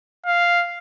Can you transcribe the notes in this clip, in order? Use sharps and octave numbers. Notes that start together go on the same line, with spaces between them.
F5